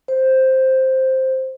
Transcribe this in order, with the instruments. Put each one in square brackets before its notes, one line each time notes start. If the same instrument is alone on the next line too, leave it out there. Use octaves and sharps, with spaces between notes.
[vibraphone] C5